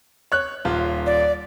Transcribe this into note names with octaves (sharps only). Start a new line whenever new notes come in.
C#5 F#6
D#1 F4
D5